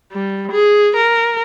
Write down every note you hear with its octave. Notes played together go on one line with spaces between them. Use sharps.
G3
G#4
A#4